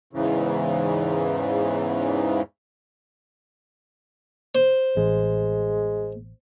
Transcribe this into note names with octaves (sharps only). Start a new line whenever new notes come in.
E2 G#2 C#3 E3
C5
A1 G#3